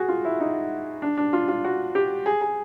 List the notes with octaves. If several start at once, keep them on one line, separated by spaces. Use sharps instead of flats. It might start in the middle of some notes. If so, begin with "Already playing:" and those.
Already playing: F#4 G#4
F4
E4
D#4
D4
D4
F4
F4
F#4
G4
G#4
G#4